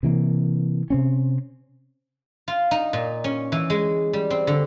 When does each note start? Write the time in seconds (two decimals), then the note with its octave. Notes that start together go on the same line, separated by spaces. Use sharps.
0.03 C3 E3 A#3
0.90 C3 C4 C#4
2.48 F4
2.71 D#4
2.93 A#2
3.24 C#4
3.52 E3
3.70 G#3
4.13 G3
4.30 C4
4.47 D3